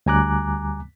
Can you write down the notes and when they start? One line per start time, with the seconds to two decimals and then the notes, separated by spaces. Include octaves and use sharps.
0.06 D2 G3 G#5 A#5 D6 F#6